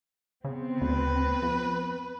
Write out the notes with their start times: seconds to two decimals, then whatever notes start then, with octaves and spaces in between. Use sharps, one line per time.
0.44 C#3 B3 C4
0.81 D2 B4
1.42 F2